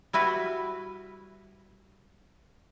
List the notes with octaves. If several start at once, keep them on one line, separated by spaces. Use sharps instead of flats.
G3 E4 F#4 B4